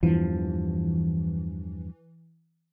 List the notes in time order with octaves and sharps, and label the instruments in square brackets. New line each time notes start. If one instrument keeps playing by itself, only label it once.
[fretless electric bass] E2 G2 F3 [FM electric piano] E3